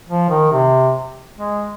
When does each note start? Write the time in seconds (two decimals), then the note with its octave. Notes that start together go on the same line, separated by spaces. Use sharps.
0.09 F3
0.30 D#3
0.52 C3
1.38 G#3